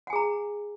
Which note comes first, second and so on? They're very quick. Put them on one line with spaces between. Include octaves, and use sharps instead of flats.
F#5 G#5 G#4 A#5